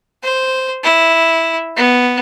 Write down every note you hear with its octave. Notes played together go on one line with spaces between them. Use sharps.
C5
E4
B3